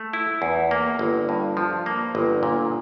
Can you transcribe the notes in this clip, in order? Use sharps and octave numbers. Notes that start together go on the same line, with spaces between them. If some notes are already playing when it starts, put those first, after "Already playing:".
Already playing: A3
E4
E2
A#3
G1
G2
F3
A#3
G1
A#2